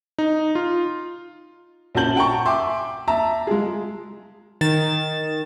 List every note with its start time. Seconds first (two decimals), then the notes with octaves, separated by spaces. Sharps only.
0.18 D#4
0.55 F4
1.95 A#1 C#4 F#4 A5 G6 F#7
2.16 F#5 G5 A5 A#5 C#6
2.46 E5 G5 G#5 C6 D6
3.08 E5 A5 A#5
3.47 G#3 F4 G#4
4.61 D#3 A6 E7